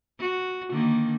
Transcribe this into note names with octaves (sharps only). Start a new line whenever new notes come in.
F#4
D3 D#3 A#3